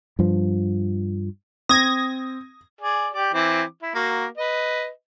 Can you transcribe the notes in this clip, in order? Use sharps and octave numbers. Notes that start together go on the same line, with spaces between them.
G2 F3
C4 D#6 G#6 A#6
G#4 D5
G4 D5
E3 C4 D6
E4
A#3 F#4
B4 D#5